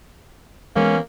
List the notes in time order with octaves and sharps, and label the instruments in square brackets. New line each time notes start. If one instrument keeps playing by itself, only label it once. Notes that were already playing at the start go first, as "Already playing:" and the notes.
[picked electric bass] E3 B3 [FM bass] G#3 [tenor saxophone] A#3 [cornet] C#4